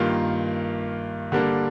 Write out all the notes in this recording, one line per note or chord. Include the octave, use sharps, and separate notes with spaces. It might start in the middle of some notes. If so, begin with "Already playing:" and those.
Already playing: G2 D#3 A#3 F4
D3 G3 A#3 D4